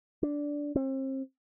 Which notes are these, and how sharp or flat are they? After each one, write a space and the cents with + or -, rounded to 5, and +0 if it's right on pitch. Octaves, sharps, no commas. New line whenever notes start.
D4 -10
C4 +35